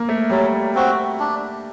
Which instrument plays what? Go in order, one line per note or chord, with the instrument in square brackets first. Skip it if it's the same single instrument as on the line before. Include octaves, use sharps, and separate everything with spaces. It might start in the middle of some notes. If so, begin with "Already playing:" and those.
Already playing: [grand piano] A#3
A3
[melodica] F#3 [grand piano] G3
[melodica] C4 F#4
D4